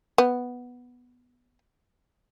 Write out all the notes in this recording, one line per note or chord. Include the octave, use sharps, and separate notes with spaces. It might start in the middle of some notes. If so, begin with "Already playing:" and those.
B3